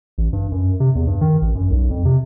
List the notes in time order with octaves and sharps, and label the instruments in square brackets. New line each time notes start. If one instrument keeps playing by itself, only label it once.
[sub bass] A1
G2
F#2
C3
E2
G2
D#3
A1
F#2
B1
F2
C3